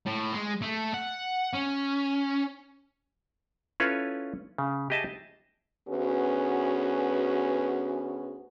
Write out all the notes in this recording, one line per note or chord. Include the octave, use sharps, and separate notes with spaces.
A2
G#3
A3
F#5
C#4
C#4 E4 F4 A4 B4 C#5
C#3
G4 G#4 D#5 E5 A5
D2 B3 C#4 F#4 G#4 B4